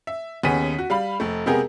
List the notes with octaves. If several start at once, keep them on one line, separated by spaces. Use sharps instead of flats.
E5
D#2 B3 C#4 G#4 B6 D#7
F#4
G3 F5 B5
F1 A3
C3 G#3 B3 G4 G#4 A#4